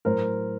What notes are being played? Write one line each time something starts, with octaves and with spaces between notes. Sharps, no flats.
A2 F#3 A#4 C5